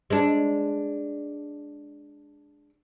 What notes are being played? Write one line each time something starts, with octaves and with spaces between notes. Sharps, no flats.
G#3 D4